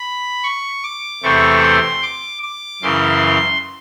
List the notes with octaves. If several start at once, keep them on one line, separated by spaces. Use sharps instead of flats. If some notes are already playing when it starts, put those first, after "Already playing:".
Already playing: B5
C#6
D6
E2 C3 E3 A3 C4 C#6
C6
D6
D6
F#2 C#3 E3 C6